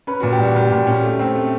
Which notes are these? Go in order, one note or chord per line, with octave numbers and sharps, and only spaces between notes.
C#4 B4
A#2 F#4
G4
G3 F#4
A#2 G4
A#2
C#4
A3
C4
A3